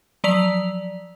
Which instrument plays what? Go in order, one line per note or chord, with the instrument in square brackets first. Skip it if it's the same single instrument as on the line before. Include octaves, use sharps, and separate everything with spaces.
[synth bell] F3 F#3 D5 B6 F7